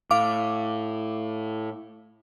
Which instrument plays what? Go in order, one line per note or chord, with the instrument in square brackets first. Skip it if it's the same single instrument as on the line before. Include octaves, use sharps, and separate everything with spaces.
[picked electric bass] A2 [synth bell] F5 D6